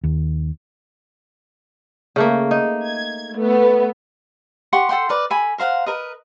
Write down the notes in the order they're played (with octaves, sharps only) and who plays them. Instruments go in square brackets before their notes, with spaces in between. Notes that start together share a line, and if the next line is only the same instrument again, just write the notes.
[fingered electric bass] D#2
[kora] C#3 A3 A#3
D#4
[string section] G#6
A3 B3
[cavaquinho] G4 F#5 C6 C#6
A4 F#5 G5 C6
A#4 B4 D5
A4 G#5 B5
A#4 C5 F5 F#5
A#4 B4 D#5